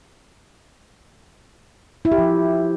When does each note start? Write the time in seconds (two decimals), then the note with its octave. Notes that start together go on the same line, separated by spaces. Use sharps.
2.05 E4
2.12 G4
2.18 F3